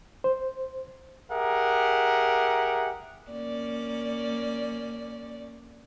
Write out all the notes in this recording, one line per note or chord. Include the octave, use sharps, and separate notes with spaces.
C5
G4 G#4 A#4 E5 F#5
A#3 C#4 D5